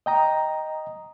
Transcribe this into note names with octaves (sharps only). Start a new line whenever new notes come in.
D#5 G5 A#5 D#6